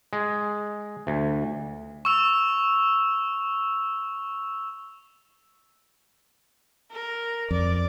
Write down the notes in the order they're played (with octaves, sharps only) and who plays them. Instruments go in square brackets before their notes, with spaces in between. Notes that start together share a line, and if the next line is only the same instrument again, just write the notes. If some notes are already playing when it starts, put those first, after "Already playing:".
[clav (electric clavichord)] G#3
D2
[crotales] C#6 E6 F7
[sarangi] A#4
[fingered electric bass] F2 [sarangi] D5